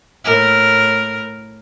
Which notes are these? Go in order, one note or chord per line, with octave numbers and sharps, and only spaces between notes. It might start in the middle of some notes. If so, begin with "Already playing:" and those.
A2 A#4